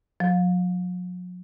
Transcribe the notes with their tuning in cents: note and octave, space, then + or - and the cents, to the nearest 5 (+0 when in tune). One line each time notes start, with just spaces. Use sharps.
F#3 -45